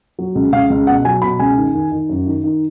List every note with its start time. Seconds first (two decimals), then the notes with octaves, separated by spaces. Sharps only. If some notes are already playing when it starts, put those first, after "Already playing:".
0.19 F#3
0.35 C#2
0.52 C#2 F5
0.70 C#2
0.87 B2 F#5
1.05 F#3 G#5
1.22 B2 B5
1.39 C#2 G#5
1.57 D#3
1.74 D#3
1.92 D#3
2.09 F#2
2.27 D#3
2.44 D#3